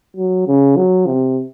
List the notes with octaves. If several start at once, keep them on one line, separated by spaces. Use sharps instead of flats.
F#3
C#3
F#3
C3